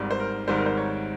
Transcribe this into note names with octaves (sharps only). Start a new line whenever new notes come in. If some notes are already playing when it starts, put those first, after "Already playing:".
Already playing: G#1 G#2 G3
C5
A#4
G#1 G#2 D#3 G3 C5
A#4
C5
C#5